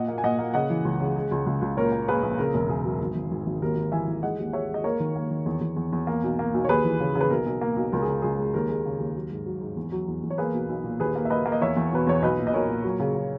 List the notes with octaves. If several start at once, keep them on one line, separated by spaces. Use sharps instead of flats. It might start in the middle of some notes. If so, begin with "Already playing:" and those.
Already playing: A#2 D#5 F#5
A#3
G#5
A#2 D#5 F#5
A#3
C#3 D#5 F#5
E3
C#2
C#3
G#3
C#2
C#2
C#2
A#2 A#4 C#5
A#3
A#3 G#4 B4
A#1
C#3 A#4
E1
C#3 G#4
F#3
G#1
G#1
G#1
G#1
D#2 A#4
D#2
E3 E5 G#5
E3
G#3 D#5 F#5
D#2
G#3 C#5 E5
G#3
D#5
A#3 A#4 C#5
D#3
A#3
D#3
E2
E2
E2
E2
A#3
B1
A#3
B1
C#5
D#2 G#4 B4
E3
C#3
C#3
B4
B1 A#4
B1
A#3
B1
C#2 A#4
G#4
C#3
C#2 G#4
G#3
D#2 A#4
G#3
C#3
D#2
F#3
G#2
F#3
G#2
E2
F#3
E2
E2
C#5
A#3 G#4 B4
B1
B1
A#2
D#2 G#4 B4
A#3
E5
A#3 B4 D#5
A#3
D#5
E2 C#5 E5
E2
B2 B4
E2 C#5
B1 B4 D#5
A#2
D#5
B1 A#4 C#5
A#2
F#3
C#3
C#3